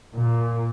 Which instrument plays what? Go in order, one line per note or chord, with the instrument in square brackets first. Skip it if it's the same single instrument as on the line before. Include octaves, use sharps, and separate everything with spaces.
[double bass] A#2